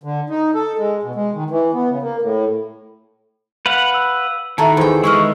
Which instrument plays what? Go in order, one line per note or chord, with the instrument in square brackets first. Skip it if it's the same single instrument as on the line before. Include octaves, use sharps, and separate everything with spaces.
[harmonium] D3
D#4
A4
G#3
B2
G#3
D#3
E3
B3
C#3
A#3
A2
[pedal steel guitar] B4 F5 F#5 [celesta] B6
[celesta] E6
[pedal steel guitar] D#3 [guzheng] E4 F#4 A4 [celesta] E5 A5 [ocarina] A#5
[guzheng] E2 G5 [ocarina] C5 [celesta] G#5 E6
[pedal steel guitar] D#3 G#3 [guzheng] E4 B4 D#5 [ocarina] C#6 [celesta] E6 F6